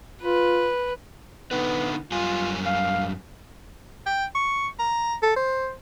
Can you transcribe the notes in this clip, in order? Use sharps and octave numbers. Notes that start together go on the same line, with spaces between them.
F4 B4
D3 B3 D#4 B4
F#2 G3 F4 G#5
F5
G5
C#6
A#5
A4
C5